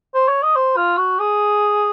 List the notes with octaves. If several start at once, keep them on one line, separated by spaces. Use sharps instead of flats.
C5
C#5
D#5
C5
F4
F#4
G#4